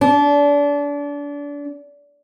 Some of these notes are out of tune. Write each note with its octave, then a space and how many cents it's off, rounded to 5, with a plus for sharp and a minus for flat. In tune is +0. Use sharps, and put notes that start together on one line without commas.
D4 -30